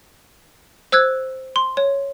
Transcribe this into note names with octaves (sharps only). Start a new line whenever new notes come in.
C5 E6 F#6 G#6
C6
C#5